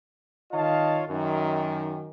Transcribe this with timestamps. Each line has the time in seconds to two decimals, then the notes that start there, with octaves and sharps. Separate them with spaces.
0.52 D#3 F4 C#5 D#5 F5 A5
1.08 F#2 D#3